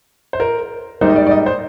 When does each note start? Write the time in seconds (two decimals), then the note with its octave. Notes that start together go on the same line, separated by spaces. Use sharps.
0.33 C5
0.40 A#4
1.01 G#2 G3 A#3 D#4 C5
1.10 D#5
1.16 D5
1.27 D5
1.31 D#5
1.46 C5